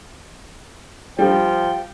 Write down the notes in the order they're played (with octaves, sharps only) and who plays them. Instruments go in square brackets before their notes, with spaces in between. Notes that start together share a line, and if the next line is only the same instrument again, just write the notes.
[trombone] F3 [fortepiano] G3 [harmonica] G5